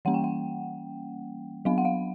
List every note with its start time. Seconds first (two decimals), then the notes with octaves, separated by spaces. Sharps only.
0.05 E3 G3 A#3 C#4 F#5
0.14 G5
0.24 F#5
1.65 F#3 B3 D4 F5
1.78 F#5
1.85 F5